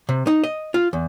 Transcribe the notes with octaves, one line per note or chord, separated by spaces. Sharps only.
C3
D#4
D#5
F4
E2